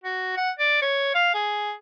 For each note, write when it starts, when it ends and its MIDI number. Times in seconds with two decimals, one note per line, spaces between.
0.04 0.36 66
0.37 0.51 78
0.59 0.80 74
0.82 1.14 73
1.15 1.31 77
1.34 1.73 68